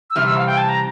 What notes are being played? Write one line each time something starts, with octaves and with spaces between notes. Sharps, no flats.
E6
C3 E3 G3 F6
E6
F5
G5
A5
A#5